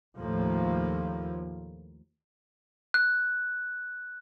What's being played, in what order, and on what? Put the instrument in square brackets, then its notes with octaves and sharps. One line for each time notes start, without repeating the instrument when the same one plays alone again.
[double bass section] D#2 A2 F3 A#3
[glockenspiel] F#6